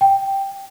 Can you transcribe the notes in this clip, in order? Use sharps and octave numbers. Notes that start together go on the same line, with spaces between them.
G5